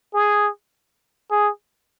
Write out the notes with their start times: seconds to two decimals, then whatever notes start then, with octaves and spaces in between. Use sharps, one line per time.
0.14 G#4
1.31 G#4